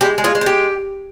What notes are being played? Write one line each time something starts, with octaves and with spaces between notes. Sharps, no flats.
G#3 E4 G4
G#3
F4 G#4
G#3
C5
G4